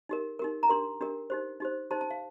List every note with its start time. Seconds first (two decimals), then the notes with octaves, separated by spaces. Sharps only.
0.09 D#4 G4 A#4
0.39 D#4 G4 A#4
0.63 A#5
0.69 D4 G4 A#4 C6
1.01 D4 G4 A#4
1.30 D#4 G4 C5
1.60 D#4 G4 C5
1.91 D#4 G4 C5 A5
2.01 A5
2.11 F5